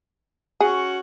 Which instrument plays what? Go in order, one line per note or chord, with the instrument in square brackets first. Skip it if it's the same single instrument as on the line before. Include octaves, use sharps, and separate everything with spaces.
[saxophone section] C#4 F#4 [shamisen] G#4